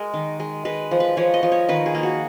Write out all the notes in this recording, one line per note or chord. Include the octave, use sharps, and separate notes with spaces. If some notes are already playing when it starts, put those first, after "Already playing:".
Already playing: G#3 A#4
D#3
G#3
G#3 B4
F3
B4
F3 C#5
D#5
F3
C#5
D#3 B4
G#4
A#3
F#4